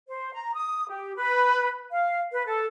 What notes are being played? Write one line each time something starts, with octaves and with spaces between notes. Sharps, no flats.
C5
A#5
D#6
G4
B4
F5
B4
A4